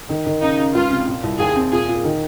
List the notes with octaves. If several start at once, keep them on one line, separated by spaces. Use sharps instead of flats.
D#3
D#3
C#3 D#4
C#3
C#2 F4
C3
A#2
C2
D#2 G#4
C4
A#2 G#4
A#2
D#3